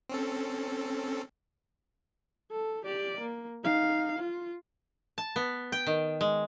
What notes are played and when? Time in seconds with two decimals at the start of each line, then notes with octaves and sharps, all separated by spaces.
0.09 C4 C#4 A4
2.51 A4
2.85 G4 D5
3.21 A#3
3.64 D#4 F5
4.19 F4
5.18 A5
5.36 B3
5.72 G5
5.87 D#3
6.21 G#3